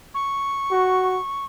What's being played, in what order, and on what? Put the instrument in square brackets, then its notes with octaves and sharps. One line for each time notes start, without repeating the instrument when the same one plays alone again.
[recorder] C#6
[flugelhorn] F#4